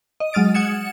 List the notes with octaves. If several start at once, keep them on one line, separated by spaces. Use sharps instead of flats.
D#5
F#3 G#3 D#6 F6 A6 D7
F#5 D#6 G#6 C#7 E7